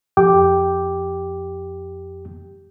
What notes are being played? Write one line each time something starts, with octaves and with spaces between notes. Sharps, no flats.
F2 G4 G5 D6